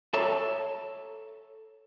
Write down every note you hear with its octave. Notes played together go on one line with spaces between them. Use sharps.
A4 C#5 E5 A5 A#5